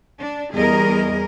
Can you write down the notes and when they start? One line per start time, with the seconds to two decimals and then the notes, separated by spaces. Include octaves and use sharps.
0.19 D4
0.53 E2 G3 G#4 A#4 D#5